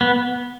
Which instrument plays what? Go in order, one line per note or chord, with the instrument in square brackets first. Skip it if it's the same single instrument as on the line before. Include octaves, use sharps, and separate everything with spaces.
[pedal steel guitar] B3